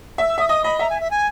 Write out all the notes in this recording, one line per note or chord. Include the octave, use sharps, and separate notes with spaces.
E5 E6
E6
E5 D#6
D#5 D#6
D#5 B5
E5 A#5
G#5
E5
G#5